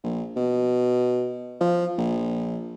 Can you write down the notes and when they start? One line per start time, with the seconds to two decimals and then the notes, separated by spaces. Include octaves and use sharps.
0.03 A#1
0.36 B2
1.61 F3
1.98 A#1